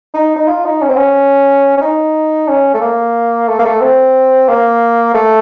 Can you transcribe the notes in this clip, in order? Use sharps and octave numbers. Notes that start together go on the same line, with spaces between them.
D#4
D#4
F4
D#4
C#4
C4
C#4
C#4
D#4
C#4
A3
A#3
A3
A#3
A3
C4
A#3
A3